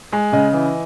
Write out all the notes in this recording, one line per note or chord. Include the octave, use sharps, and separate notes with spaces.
G#3
C#3 D#5
E3